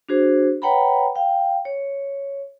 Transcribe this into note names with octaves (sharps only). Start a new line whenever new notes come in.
D4 F#4 G#4 C5
B4 C#5 F#5 G5 A#5 B5
F5 G5
C#5